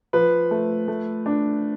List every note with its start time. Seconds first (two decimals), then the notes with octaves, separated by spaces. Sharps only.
0.13 F3 B4
0.51 A3
0.88 A3
1.26 D4